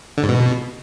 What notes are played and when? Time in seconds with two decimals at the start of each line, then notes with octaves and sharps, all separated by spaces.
0.18 D3
0.23 G#2
0.29 B2